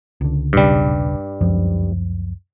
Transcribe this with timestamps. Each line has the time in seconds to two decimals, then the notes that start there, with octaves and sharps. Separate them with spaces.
0.21 C#2 D3
0.53 D#1 B1 G2 C#3 G3
1.41 C#2 F#2 F3